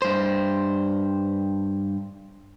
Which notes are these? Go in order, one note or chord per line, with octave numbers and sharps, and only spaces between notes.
G2 C5